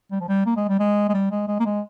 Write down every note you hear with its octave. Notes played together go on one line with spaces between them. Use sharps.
G3
F3
G3
A#3
G#3
G3
G#3
G#3
G3
G#3
G#3
A#3
G#3